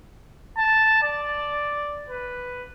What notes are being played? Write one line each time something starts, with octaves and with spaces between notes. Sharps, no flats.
A5
D5
B4